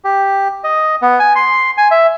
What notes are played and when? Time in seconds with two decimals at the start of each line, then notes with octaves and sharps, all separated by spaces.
0.04 G4
0.64 D#5
1.02 B3
1.19 G#5
1.35 C6
1.78 G#5
1.91 E5